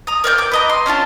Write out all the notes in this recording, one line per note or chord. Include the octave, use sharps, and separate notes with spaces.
A#5 D#6
A#4 D5 E5 G6
D6
B4 D#5 A#5
C6
C#4 D4 F4 A5